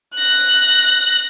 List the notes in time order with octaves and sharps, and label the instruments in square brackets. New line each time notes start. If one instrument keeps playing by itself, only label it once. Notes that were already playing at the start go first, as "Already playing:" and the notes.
[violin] F#6 A#6